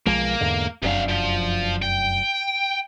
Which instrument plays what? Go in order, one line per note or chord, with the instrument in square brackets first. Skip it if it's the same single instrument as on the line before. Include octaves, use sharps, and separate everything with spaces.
[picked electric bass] B1 F3 G#3 [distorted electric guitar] A#3
[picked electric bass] E2 G#2 D3
[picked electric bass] F1 F#2 D4 [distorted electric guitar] C3 F5
[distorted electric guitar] F3
G5